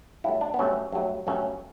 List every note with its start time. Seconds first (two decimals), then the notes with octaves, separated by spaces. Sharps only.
0.24 G2 F#3 A3 E4
0.41 D4
0.54 B3
0.59 G2 F#3 A3 C#4
0.92 G2 F#3 A3
1.27 G2 F#3 A3 C#4